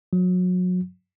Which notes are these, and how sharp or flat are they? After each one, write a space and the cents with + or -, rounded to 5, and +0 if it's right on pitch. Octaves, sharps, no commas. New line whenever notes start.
F#3 -30